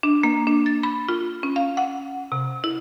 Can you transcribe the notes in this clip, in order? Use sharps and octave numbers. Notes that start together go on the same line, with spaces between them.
D4
A#3
D4
A6
B5
F4
C#4
F5
F#5
C3
E4